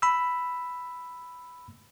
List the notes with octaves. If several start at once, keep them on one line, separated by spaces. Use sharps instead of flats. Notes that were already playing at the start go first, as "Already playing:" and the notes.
B5 E6